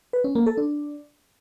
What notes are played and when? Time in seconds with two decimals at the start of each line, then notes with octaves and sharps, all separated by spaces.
0.13 B4
0.24 C#4
0.35 A#3
0.46 A4
0.57 D4